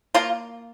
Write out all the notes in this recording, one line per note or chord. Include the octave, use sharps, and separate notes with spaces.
A#3 F4